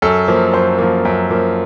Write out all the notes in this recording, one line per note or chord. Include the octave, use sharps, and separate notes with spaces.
F#2 A4
F3 A#3
F#2 C5
F3 A#3
F#2
F3 A#3